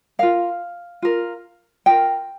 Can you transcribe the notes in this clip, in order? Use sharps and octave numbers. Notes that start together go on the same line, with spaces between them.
F4 A#4 F5
F4 A#4
F4 A#4 G5